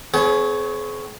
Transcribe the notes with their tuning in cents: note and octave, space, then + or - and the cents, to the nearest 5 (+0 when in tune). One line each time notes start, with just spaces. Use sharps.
C4 -45 G#4 +35 C#5 +0